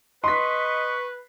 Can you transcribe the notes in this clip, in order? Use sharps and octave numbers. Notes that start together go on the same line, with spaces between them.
B4 D#5 C6 C#6 B6